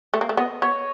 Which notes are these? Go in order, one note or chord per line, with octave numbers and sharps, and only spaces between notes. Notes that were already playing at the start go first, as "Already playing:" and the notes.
A3
A#3
A3
B3 D#5
B3 C#5